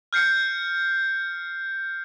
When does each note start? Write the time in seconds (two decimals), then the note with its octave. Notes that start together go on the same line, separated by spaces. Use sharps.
0.13 F6 G6 C7 C#7